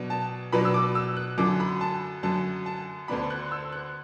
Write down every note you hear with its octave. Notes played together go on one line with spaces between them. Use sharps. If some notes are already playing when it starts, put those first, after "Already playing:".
Already playing: B2 F#3 B3 D4
A5
B2 F#3 B3 D4 B5
E6
D6
E6
F#6
F#2 D3 F#3 D6
B5
A5
F#2 D3 F#3 A5
A5
D2 D3 B3 D4 B5
F#6
E6
F#6